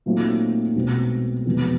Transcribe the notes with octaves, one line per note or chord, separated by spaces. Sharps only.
A#2 F#3 A3 C4 D#4
B1 B2 G#3 C4
F1 E2 B2 G#3